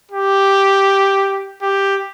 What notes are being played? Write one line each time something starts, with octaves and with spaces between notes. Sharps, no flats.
G4
G4